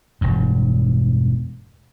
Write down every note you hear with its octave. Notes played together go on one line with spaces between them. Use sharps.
E1 G2